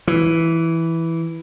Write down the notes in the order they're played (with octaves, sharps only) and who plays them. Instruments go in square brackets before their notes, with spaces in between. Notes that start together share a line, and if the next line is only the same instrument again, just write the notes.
[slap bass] E3